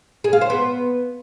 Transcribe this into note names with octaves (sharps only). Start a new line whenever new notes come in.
G#4
F4
C5
B3